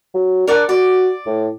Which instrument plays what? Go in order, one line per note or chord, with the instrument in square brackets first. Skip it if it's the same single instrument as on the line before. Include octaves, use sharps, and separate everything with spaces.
[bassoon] F#3
[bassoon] D4 [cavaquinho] A#4 D5 F#5
[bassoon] F#4 [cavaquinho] D5
[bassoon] A2